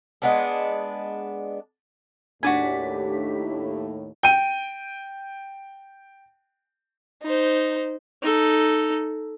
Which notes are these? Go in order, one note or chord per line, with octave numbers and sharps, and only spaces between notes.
G#3 B3 D4
D#2 A2 D4 F#4 G4 D5 G#5 B6
G5 D#7
D#4 C5
D#4 A4